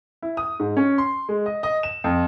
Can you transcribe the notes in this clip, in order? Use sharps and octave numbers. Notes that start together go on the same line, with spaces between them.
E4
D#6
G#2
C#4
C6
G#3
D#5
D#5
E7
F2